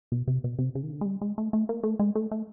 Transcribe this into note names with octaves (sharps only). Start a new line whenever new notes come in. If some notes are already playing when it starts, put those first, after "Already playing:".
B2
C3
B2
C3
C#3
D#3
D3
G#3
G3
G#3
A3
A3
A#3
A3
G#3
A3
A3